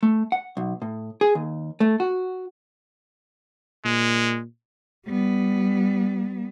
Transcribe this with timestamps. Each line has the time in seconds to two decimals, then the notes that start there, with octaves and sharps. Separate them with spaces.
0.03 A3
0.32 F#5
0.57 B1
0.82 A2
1.21 G#4
1.35 D#2
1.80 A3
2.00 F#4
3.85 A#2 G#3
5.06 G3 B3